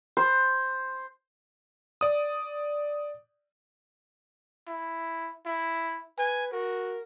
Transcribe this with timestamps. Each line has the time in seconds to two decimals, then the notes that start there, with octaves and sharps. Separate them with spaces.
0.17 C5
2.01 D5 D#6
4.68 E4
5.46 E4
6.18 B4 G#5
6.53 F#4 A#4